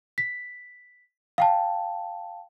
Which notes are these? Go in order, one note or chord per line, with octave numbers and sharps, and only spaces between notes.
B6
F5 G5 A5